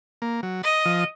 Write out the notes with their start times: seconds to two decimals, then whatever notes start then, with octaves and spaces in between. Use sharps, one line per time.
0.22 A#3
0.43 F#3
0.63 D#5
0.85 F3